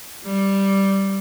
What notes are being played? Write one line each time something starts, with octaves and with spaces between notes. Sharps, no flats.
G3